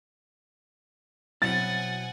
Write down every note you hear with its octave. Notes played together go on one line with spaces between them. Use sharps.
B2 F#3 C4 E4 F#5 G#5 A6